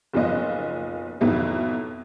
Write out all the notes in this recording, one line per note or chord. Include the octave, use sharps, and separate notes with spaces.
F#1 B1 F3 B3 D#5
F2 B2 D#3 F#3 B3 E4